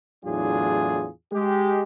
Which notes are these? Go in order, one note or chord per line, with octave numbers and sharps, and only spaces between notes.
E2 A2 F#3 D4 F4 G#4
G#3 G4